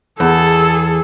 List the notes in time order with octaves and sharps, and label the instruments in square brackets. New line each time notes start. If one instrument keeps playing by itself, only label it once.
[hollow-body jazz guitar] E2 [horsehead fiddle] G#4 A4